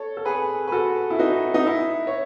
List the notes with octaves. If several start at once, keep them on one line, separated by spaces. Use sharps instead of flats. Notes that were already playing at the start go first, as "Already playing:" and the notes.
Already playing: A4 C#5
A4
G#4 B4
B4
F#4 A4
E4
D#4 F#4
D#4
E4
C#5